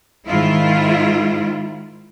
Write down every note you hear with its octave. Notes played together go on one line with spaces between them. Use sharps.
G#2 D#3 E4 F4